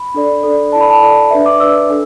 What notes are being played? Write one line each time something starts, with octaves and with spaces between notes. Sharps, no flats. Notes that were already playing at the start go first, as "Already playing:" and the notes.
Already playing: B5
D4 A4 D5
D4 A4 D5
E4 A4 D5 A5
B5
A5
E4 A4 D5
D4 B4 D5 E5
D6
D4 B4 D5 E6
D4 A4